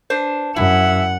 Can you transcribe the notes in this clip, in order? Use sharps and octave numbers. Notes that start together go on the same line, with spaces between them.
D4 B4 C5
F#2 E4 E5 F#5